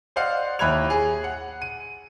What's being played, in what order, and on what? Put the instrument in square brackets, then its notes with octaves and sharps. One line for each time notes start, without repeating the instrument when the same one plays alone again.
[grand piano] C5 D5 D#5 F5 F#5
D#2 E4 B5 F#6 G#6 F7
G#4
F#5
D#7